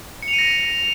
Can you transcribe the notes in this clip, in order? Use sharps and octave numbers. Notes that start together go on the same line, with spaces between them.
C#7
F7
D#7
A#6